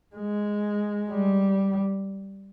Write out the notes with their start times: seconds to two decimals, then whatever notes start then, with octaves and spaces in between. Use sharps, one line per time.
0.16 G#3
1.09 G3